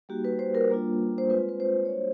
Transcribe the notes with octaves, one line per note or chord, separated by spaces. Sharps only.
G3 A#3 D#4 F#4 G4
B4
C5
A#4
G3 A#3 D4 F4
C5
G#3 C4 F4 B4
B4
C5
C#5
G3 A#3 D4 F#4 C5